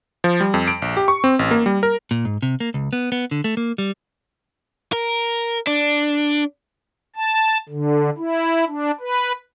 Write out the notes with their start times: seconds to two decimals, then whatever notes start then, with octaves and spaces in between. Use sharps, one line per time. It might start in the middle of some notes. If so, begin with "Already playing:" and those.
0.24 F3
0.41 G3
0.54 F2
0.68 D7
0.82 A#1
0.97 G4
1.08 C#6
1.24 C4
1.39 A1
1.51 A#3
1.66 G3
1.83 A#4
2.11 A#2
2.25 G#2
2.42 C3
2.60 A#3
2.74 C#2
2.93 B3
3.12 B3
3.31 D3
3.44 A3
3.57 A#3
3.78 G3
4.93 A#4
5.67 D4
7.16 A5
7.69 D3
8.18 E4
8.68 D4
9.00 B4